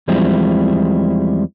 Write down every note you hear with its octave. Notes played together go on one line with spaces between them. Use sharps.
E2 F3 G3 G#3 C4 E4